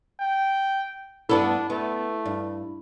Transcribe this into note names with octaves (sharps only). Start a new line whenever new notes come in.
G5
G2 B3 D4 E4 A4 B5
A3 B3
G2